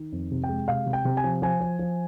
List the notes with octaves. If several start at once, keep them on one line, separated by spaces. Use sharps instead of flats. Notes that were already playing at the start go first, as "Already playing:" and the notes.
Already playing: D#3
F2
C3
G5
G#3
C3 F5
C3
G5
C3
G#5
F3
F3 G#5
F3
F3